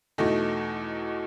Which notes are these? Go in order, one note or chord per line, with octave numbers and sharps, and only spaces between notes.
E2 B2 A3 D#4